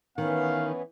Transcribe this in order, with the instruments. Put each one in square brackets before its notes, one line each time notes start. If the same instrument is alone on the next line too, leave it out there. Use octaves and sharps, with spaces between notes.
[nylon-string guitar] D#3 [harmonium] E3 B3 C#4 [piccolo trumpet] F5